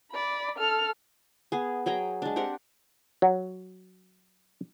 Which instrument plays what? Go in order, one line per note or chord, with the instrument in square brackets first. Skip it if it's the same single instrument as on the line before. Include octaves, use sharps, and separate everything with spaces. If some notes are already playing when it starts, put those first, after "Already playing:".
[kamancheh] D5 B5
A4 F6
[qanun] B3 G#4
F#3 G#4 G5 A#5
G#3 D4
C4 G4 A#4 F#5
[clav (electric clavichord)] F#3